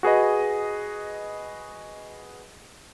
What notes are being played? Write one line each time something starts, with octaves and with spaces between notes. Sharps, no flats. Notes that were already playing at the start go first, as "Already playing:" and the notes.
F#4 G#4 B4 D#5